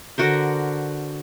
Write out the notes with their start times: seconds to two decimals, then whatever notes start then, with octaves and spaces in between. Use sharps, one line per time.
0.18 D3 F#4 A#4 C5